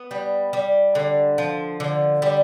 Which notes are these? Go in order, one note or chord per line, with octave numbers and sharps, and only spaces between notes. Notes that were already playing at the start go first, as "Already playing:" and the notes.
Already playing: B3
G3
G3
D3
F3
D3
G3